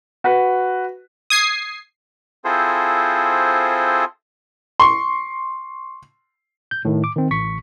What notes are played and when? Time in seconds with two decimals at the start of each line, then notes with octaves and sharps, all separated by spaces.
0.24 F#4 B4
1.30 D#6 G#6 C7
2.45 C4 E4 F4 G#4 A4 C5
4.80 C6 C#6
6.71 G6
6.85 A2 D#3
7.04 D6
7.16 D#3 C4
7.31 A1 C#6 B6